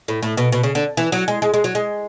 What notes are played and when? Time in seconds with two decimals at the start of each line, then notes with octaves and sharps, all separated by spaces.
0.08 A2
0.23 A2
0.37 B2
0.52 B2
0.63 C#3
0.75 D3
0.97 E3
1.12 F#3
1.28 G#3
1.42 G#3
1.54 G#3
1.64 F#3
1.75 G#3